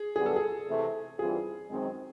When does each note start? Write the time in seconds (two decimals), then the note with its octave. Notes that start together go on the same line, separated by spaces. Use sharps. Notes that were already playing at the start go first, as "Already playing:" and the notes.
Already playing: G#4
0.16 F#2 D3 G3 B3 G#4
0.26 A4
0.36 G#4
0.68 C3 E3 A3
1.18 G2 E3 G3 C4 F4 G#4
1.70 F#2 D#3 G#3 C4